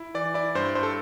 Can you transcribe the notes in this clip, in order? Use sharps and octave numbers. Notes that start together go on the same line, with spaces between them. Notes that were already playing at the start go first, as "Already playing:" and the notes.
Already playing: E4
E3 D5
E4 D5
G2 C5
G2 C5
A4